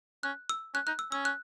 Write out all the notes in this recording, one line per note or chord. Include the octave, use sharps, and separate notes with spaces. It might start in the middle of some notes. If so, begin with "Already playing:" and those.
C#4 F#6
E6
C#4 F#6
D#4 F#6
E6
C#4 E6
F#6